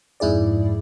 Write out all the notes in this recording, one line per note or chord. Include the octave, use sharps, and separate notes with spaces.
F2 G#2 E4 G#4 D5